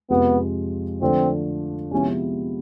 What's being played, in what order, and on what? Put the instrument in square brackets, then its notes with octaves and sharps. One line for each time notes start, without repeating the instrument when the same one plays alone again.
[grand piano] F2 C3 F3 G#3 [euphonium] B3
[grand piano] D3 F3 A3 D4 [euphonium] C4
[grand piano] C3 F3 G#3 B3 E4 [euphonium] C#4